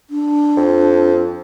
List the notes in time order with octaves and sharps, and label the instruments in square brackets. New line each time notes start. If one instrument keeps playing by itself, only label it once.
[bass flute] D4
[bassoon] F2